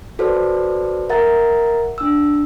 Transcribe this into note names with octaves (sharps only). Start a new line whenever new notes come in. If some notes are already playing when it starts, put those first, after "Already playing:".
F#4 A4 B4 C5 D5
A#4 E5 F#5 A#5 A6
D4 E6